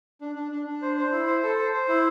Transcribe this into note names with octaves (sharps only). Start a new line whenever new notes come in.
D4
D4
D4
D4
C5
C5
E4
C5
A4
C5
C5
E4